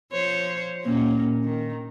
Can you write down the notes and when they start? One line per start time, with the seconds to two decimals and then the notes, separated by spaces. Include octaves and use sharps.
0.12 F3 C5 C#5
0.84 A#2 A#3 C#4
1.43 D#3